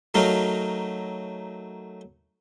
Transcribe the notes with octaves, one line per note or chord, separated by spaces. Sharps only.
F#3 A3 D#4 A#4 F5